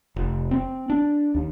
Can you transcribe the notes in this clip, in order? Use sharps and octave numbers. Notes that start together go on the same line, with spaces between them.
F1
C4
D4
D#2